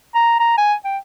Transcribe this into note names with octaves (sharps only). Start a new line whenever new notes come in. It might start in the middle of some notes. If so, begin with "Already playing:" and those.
A#5
A#5
G#5
G5